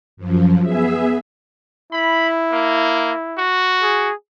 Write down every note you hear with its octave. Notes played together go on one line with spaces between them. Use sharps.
F#2 F3
B3 G#4 E5
E4 B5
A#3
F#4
G#4